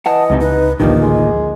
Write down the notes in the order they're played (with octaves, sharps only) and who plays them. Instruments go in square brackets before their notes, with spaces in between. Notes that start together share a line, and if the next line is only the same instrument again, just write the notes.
[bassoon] E3 [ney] D#5 [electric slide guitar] F#5 A5
[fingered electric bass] C#2 [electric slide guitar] G#2 C3 D#4
[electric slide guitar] D#4 [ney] B4
[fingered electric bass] A1 D2 [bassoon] G2 [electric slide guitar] D#3 F3 A#3 [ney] D#4
[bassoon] G#3